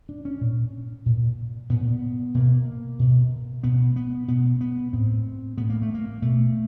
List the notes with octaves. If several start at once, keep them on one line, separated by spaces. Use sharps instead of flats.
D4
C#4
A#2
A#2
A#2 B3
B2 A#3
B2
B2 B3
B3
B2 B3
B3
A2 C4
A2 B3
A#3
A3
A#3
B2 A3